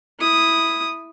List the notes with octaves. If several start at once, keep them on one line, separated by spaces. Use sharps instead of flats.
E4 D#6